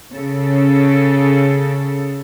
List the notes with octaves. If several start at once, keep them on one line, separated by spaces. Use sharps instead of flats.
C#3 A4